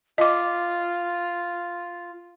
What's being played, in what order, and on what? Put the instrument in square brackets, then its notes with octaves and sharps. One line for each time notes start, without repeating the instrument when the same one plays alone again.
[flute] F4 [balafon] D#5 D6